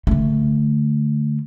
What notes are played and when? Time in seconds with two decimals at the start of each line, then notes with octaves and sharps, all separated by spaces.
0.07 D3 A3